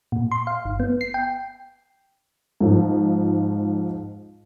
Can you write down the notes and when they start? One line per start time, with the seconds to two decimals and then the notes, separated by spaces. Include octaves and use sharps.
0.12 A#2
0.31 C6
0.47 F5
0.65 G1
0.80 B3
1.01 C7
1.14 G5
2.60 G#2 F3